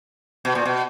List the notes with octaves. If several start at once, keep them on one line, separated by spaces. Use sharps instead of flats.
B2
A#2
B2